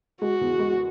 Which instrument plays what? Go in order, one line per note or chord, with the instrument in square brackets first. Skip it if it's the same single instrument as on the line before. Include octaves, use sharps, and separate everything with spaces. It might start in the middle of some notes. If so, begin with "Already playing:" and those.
[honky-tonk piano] G#3 [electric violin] F#4
[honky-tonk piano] E2
G#3